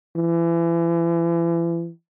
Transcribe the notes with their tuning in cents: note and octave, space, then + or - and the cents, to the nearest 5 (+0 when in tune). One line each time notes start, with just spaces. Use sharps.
E3 +35